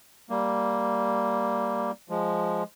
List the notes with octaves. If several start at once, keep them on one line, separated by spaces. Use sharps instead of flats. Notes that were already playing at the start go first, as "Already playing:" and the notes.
G3 A#3
F3 G#3